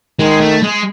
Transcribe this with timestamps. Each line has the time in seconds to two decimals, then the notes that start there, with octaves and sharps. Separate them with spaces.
0.19 D#3 G#3
0.40 A3
0.62 G#3